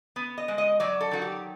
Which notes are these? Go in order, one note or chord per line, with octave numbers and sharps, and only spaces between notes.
B3
D#5
G#3
D#5
F#3 D5
A4
D#3 F#4
G4